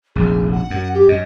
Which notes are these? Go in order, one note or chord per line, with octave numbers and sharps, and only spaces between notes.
F1 A#1 G#4
F#5
F#2
G4
F#2 D#5